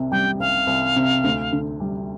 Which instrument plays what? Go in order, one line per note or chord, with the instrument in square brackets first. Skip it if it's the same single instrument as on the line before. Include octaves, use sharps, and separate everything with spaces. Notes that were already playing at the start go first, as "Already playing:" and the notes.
Already playing: [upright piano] C2 C3
[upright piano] G3 [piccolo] G5
[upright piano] C2 [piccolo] F5
[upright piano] C2
C3
D2
D3
G3